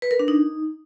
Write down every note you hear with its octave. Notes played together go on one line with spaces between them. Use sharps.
B4
A#4
D4
D#4